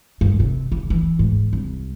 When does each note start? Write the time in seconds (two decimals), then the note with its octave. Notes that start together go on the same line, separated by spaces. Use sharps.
0.21 G2
0.40 C3
0.72 C#3
0.90 E3
1.19 G#2
1.53 C2